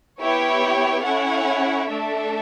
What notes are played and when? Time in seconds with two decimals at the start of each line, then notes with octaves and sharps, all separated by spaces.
0.20 B3 E4 G4 C#5 G5
1.04 C#4 E4 A4 C#5 F#5
1.89 A3 D4 A4 E5